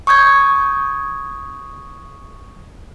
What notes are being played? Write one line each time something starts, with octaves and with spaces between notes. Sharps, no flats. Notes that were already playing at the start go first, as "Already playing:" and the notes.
C#6 D#6 G6 G#6